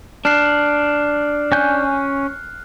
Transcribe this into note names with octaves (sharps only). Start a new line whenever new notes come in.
D4 F6 F#6 C7
C#4 G#5 F#6 G6